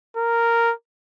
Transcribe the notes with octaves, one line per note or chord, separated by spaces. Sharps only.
A#4